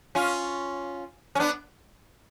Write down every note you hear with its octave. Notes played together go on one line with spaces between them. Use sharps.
C#4 F4
C#4
B3 D4